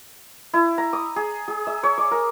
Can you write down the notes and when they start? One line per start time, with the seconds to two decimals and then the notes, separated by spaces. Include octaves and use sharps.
0.54 E4
0.78 A#5
0.93 D#6
1.16 G#4
1.48 G#4
1.67 E5
1.83 C#5
1.98 D5
2.11 A#4